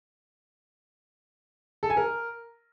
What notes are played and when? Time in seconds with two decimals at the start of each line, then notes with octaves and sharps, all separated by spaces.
1.83 A4
1.90 G#5
1.97 A#4